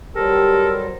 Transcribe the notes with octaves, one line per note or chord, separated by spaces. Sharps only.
F#3 G3 G4 A4 A#4 C5